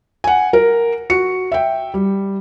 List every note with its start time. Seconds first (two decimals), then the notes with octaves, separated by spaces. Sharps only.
0.24 F#5 G#5
0.53 A#4
1.10 F#4 C#7
1.52 E5 G5
1.94 G3